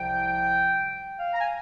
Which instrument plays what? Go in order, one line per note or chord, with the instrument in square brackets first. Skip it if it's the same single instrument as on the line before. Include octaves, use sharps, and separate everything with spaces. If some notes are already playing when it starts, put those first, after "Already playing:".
Already playing: [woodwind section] C2 C3 F3 G5
F5
A#5
G#5